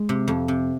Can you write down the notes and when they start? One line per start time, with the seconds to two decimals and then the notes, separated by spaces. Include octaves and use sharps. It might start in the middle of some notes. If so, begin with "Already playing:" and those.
Already playing: G#3
0.09 C3
0.28 F2
0.48 C3